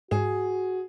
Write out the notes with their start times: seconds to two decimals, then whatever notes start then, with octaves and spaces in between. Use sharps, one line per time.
0.11 G#2 F#4 G#4 E7